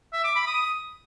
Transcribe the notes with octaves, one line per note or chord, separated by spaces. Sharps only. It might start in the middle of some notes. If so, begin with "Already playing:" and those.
E5
D6
B5
D#6